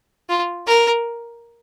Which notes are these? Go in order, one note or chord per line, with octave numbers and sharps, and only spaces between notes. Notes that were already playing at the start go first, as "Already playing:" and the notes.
F4
A#4